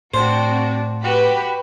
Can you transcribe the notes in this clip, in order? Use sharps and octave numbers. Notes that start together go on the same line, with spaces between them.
A2 C4 D4 F#4 C5
F#4 G4 B4 B5